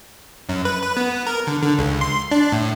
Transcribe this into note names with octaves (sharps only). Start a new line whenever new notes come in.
F#2
B4
B4
B3
A#4
D3
D3
C#2
C6
D4
A2